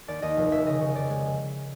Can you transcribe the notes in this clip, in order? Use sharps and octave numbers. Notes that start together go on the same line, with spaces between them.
D#2 D5
D#2 D#5
F1
F1 E5
C#3 D#5
C#3
D#5
F2 D5
G#3